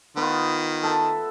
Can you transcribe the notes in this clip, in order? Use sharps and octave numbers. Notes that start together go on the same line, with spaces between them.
D#3 B3 F4
A4 E5 A5